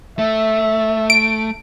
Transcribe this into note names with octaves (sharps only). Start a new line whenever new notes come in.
A3 E5
D7